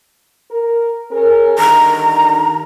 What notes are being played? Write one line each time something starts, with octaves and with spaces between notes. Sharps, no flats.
A#4
C#4 G#4 A#4
G2 D3 D#3 A#5